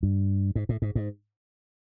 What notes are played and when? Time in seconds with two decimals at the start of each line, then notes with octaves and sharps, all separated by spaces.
0.03 G2
0.56 G#2
0.69 A2
0.82 G#2
0.95 G#2